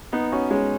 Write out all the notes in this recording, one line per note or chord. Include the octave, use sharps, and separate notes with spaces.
B3 D#4
C#4 F#4
G#3 C#4